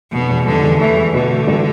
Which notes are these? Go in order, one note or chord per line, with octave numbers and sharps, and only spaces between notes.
F1 B2
E2
F1 D3
E2
E3 A3
E2
B2 D3
A3
A1